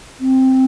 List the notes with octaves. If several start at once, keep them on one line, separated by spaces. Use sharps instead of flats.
C4